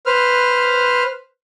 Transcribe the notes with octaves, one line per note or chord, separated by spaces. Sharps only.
B4 C5 F6